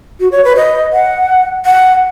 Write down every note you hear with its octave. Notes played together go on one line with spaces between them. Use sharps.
F#4
C#5
B4
D#5
F#5
F#5